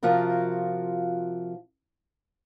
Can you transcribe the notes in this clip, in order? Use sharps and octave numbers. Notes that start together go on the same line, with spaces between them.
C3 F3 F4 F#4 A#4